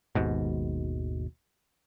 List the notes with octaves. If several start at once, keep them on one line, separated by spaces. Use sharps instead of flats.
G#1 D#2 G#2 B2